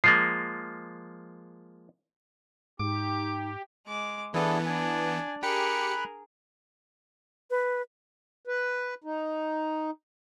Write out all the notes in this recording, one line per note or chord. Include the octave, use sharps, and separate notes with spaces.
F3 G#3 A#3 A6 C7
G#2 D#4 G4 D6
G#3 D6
E3 B3 D4 E4 G#4 A4
D4 G#5
G4 G#4 A#4 B5 F#6 C#7
B4
B4
D#4